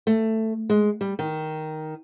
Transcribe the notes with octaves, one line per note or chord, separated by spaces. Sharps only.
A3
G#3
G3
D#3